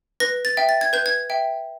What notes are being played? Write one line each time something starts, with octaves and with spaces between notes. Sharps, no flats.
B4 A#6
A6
E5 G5
A6
G#6
B4 G6
G#6
E5 G5